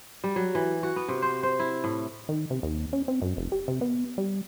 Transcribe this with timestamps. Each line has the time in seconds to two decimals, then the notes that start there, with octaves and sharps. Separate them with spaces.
0.24 G3
0.36 F#3
0.55 E3
0.83 F#4
0.96 B3
1.08 C3
1.22 C5
1.43 C5
1.59 E4
1.84 A2
2.29 D#3
2.50 C3
2.63 D#2
2.93 C#4
3.08 C4
3.22 F#2
3.37 F1
3.52 G4
3.68 C3
3.81 B3
4.18 G3